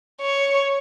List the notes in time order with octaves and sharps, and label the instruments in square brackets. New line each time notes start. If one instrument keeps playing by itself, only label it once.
[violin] C#5